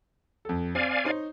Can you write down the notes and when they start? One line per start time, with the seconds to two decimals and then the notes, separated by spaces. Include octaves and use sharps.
0.45 F2 A4
0.75 C4 D5 F5 G#5
1.04 D#4 C5 C#5